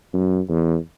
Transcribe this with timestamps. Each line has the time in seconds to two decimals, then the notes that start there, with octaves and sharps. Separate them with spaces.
0.13 F#2
0.50 E2